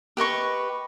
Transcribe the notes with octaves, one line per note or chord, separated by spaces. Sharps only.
G4 B4 D#5 C#6